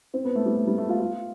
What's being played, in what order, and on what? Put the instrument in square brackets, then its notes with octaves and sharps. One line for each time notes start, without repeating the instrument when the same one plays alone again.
[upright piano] C4
B3
A3
G3
A3
G3
A3
F4
F4